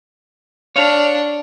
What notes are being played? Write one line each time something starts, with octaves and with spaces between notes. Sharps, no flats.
D4 C#5 F5